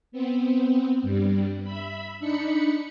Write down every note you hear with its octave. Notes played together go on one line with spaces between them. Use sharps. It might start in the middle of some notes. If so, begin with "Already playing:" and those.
B3 C4
G2 G3
E5 B5
D4 D#4 B5 C#7